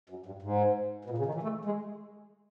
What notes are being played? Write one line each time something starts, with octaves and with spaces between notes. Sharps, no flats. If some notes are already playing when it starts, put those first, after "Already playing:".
F#2
G2
G#2
B2
A#2
C#3
D#3
E3
A3
G#3